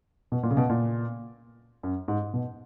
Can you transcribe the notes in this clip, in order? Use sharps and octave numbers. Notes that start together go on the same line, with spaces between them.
B2
A#2
C#3
B2
A#2
F#2
G#2
B2